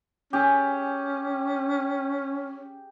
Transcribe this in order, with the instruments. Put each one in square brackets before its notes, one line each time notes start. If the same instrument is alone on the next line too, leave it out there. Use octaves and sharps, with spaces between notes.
[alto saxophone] C#4 [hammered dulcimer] G4 G#4